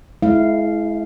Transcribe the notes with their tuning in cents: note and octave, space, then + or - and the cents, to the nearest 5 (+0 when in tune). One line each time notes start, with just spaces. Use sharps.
G#3 +35 E4 -5 F5 -10